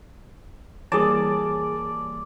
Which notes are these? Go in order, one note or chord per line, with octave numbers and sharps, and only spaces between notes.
E3 G3 A#3 G#4 D5 A5